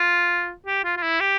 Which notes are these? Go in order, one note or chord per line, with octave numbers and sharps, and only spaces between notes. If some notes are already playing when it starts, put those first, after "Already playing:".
Already playing: F4
G4
F4
F4
E4
G4